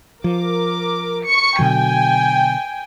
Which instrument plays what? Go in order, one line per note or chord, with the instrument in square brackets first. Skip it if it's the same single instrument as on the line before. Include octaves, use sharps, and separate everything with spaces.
[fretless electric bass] F3 [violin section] A#4 D6
[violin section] C#6 C#7
[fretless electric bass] B2 D3 F#3 [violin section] G5 G#5